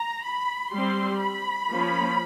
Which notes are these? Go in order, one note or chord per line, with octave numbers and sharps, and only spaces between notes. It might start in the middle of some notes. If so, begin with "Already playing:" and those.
Already playing: A#5
B5
G3 C4 C6
B5
F3 A#3 C#4